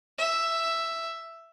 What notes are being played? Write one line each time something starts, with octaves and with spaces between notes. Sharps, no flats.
E5